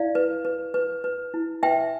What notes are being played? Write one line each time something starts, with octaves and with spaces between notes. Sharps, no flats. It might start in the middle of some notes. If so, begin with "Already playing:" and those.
Already playing: E4 D5 F5
B4
B4
B4
B4
E4
B4 E5 G5